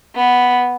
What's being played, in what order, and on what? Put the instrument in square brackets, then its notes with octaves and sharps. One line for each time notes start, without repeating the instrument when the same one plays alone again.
[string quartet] B3